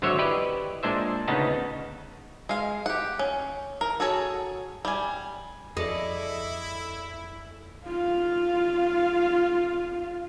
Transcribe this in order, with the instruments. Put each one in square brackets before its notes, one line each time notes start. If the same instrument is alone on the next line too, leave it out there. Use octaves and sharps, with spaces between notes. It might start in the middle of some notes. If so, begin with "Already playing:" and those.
[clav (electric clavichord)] G#1 D3 F#3 C5 C#5 E5
E4 G4 B4 D5 D#5
A#2 G#3 D4 C5 E5
D2 C#3 B3 D#4 A5
[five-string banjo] G#3 F5
G4 F#5
C#4
A#4
F#4 G#4 A4 C#5
G3 G#5
[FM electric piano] F2 [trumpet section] E4 [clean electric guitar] G#4 A4 D5 [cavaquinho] D#5
[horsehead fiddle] F4 F5